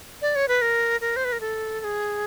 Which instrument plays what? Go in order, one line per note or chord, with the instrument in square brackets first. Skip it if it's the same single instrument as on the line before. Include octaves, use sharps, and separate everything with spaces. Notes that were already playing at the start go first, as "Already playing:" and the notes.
[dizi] D5
C#5
B4
A#4
A#4
C5
B4
A#4
A4
A4
G#4